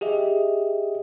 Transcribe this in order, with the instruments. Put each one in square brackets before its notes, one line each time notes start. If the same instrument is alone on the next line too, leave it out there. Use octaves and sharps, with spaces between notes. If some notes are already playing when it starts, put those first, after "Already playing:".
[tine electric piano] G4 G#4 D#5 E5